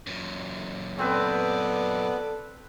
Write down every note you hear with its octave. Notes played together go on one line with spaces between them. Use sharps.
F#2 A#2
B3 C4 A4 B4 D5